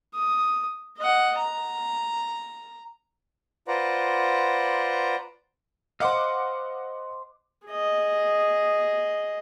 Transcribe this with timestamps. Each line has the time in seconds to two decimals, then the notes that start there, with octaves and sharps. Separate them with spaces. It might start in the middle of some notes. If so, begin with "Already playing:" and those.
0.14 D#6
0.98 D#5 F#5
1.38 A#5
3.68 F4 B4 C5 D5 F#5 A#5
6.00 C5 D#5 F5 F#5 D6
7.67 G#4 D#5